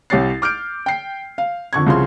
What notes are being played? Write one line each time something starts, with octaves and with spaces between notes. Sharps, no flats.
C2 G4 C#5 A6 C7
D6 F6 G6 D7
G5 C7
F5
F2 D3 C#6 G#6
C2 C#3 F3 C6